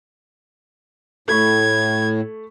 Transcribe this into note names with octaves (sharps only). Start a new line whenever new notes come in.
A2 A3 B5 C#6 G#6